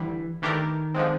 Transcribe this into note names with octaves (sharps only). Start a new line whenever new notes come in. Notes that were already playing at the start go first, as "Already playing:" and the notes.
Already playing: D2 D3 E3 G3
D#3 E3 A3 D4 G4 A#4
D3 F3 G#3 C4